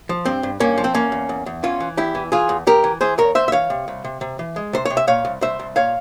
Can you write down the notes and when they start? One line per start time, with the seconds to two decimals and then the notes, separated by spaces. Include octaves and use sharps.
0.09 F3
0.25 G2 C4
0.43 G2
0.60 G2 A#3 C#4
0.78 F3
0.84 C4
0.94 E2 A#3 C#4
1.12 E2
1.29 E2
1.46 E2
1.63 E3 C#4 F4
1.80 E3
1.97 E2 E4 G4
2.15 E3
2.32 E3 F4 G#4
2.49 E2
2.67 E2 G4 A#4
2.84 E3
3.01 E3 G#4 C5
3.18 E2 A#4 C#5
3.35 E2 C5 E5
3.48 E5
3.52 E3 C#5 F5
3.70 C3
3.88 C2
4.05 C3
4.21 C3
4.39 E3
4.56 G#3
4.73 C3 C5
4.85 C3 C#5
4.97 E5
5.07 A#2 C#5 F5
5.25 C2
5.41 C2 C5 E5
5.60 C2
5.76 A#2 C#5 F5